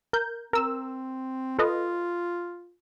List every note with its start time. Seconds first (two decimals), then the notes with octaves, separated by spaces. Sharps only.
0.13 A#4 G6
0.53 C4 A#4 E6
1.59 F4 A4 B4 D#5